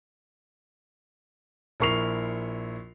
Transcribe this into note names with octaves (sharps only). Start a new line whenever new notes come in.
A#1 E4 A#4 C#6 C7 F7